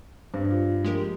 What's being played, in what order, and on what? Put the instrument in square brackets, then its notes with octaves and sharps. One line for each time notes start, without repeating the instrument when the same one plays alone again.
[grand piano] G2 [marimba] C5
[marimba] F4
[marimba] F3 A#3 D4 [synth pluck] G#3 G4 A#4